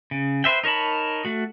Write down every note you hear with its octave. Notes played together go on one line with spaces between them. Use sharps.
C#3
B4 C5 E5 G5
D#4 A#4 C#5 A5 B5
A3 F#4